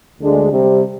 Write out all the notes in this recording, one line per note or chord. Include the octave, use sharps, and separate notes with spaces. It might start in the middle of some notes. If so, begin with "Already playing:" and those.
D2 D3 G#3 D4
C3 G3 C4 G4